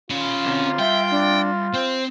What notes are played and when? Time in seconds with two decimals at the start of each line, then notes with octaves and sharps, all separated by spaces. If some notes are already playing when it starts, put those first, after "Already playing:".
0.10 C#4 F4 B5
0.46 D3 C4
0.79 G3 E5 G5 C6
1.11 D4
1.73 C4 C5